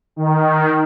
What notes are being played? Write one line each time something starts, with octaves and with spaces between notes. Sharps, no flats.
D#3